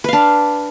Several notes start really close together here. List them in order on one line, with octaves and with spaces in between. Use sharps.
B4 F5 D4